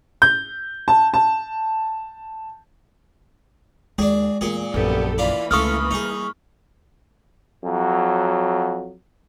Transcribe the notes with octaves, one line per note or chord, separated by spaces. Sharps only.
G6
A5
A5
D#2 G#3 D4 G#4
E2 A#2 G#4
A#1 F#2 B3 G4 A4
E3 A#3 D4 F4 B5
C#2 D3 A3 F4 A4 C#6 D#6 F6
G3 D#4 G#4
F2 F#3